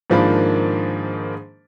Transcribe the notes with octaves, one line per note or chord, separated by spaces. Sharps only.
G#2 D#3 F3 A#3 D4 B5